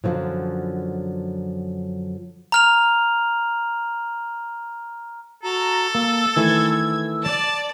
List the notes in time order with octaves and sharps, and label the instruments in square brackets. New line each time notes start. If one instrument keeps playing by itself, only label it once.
[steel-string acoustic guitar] F#2 D3 D#3 F3 F#3
[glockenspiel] A#5 F6 F7
[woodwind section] F#4 A5 A#5 [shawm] A4
[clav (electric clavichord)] A#3 [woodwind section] E6
[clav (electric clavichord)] D#3 E3 A3 [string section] G#6
[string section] D5 [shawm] A5